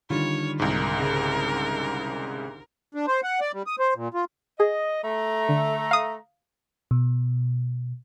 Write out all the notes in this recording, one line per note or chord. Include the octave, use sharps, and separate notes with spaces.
D3 D#3 G3 F4 C#5
C2 G#2 A#4
C#3 G#3
D4
C5
F#5
D5
G3
D#6
C5
A#2
F4
G#4 D#5
A3 A#5
D3
F5 D#6
B2